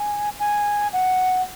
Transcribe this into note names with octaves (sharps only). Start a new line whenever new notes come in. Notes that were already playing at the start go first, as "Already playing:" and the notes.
Already playing: G#5
G#5
F#5